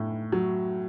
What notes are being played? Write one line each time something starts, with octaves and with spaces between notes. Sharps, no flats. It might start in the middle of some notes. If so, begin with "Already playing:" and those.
Already playing: A2
F#3